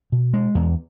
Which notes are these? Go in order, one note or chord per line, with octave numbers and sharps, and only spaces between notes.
B2
G#3
E2